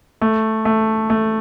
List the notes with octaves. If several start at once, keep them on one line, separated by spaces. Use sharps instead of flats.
A3
A3
A3